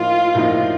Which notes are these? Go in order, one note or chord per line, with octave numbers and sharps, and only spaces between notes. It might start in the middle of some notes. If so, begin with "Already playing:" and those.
Already playing: A2 F3 A#3 D#4 F4
A2 F3 A#3 D#4